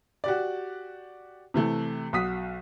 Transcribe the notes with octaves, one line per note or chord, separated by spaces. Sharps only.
F#4 G4 D5
C3 E3 A3
B1 F#4 D#6 B6